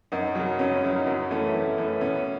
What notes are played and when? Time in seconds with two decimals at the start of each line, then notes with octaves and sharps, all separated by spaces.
0.12 F#2 D#4
0.35 C#3 F#3
0.59 F#2 C#4
0.75 E4
0.82 C#3 F#3
0.91 D#4
1.07 F#2
1.31 E3 A3 C#4
1.54 F#2
1.78 E3 A3 C#4
2.01 B2 C#4